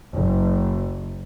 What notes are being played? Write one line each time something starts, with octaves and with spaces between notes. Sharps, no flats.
F#1